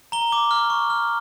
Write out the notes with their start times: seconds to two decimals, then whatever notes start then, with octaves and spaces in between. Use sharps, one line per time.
0.12 A#5 G7
0.32 D6
0.51 F6
0.70 C#6
0.90 F6